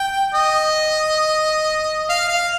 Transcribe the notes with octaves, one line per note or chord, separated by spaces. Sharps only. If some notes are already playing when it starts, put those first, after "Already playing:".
Already playing: G5
D#5
F5
F5